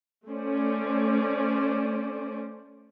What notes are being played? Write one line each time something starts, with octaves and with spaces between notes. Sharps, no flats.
A3 C#4 C5 D5